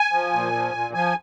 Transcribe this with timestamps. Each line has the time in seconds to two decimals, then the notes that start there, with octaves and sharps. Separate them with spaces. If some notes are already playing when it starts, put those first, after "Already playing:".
Already playing: G#5
0.13 F3
0.33 A#2
0.53 F3
0.73 A#2
0.94 F3 G#5